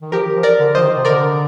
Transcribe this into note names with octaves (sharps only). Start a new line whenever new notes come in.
D#3
F3 G4 A#4
F3
A#4 D5
D3
F3 C5 D#5
D#3
C3
D3 A#4 D5